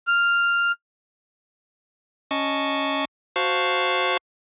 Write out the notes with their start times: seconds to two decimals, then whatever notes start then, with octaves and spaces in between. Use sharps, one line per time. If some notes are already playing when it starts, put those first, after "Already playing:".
0.07 F6
2.31 C#4 D#5 A5 C#6
3.36 F#4 C5 F5 A5 C#6